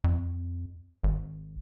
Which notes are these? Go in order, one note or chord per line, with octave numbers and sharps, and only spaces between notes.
F2
G#1